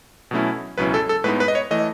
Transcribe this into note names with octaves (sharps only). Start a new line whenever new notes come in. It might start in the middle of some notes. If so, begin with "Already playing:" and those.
B2 F#3 A3 C#4 E4
C#2 B2 F#3 C#4 E4 B4
A4
A4
A2 G#3 B3 D#4 B4
B4
D#5
C#5
E3 A3 D#5